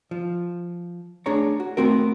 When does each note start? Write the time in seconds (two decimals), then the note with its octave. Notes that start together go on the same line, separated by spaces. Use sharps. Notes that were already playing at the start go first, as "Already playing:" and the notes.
0.11 F3
1.26 A3 D4 G#4 C#5 A#5
1.60 F#4
1.77 A3 B3 C4 F#4 A#4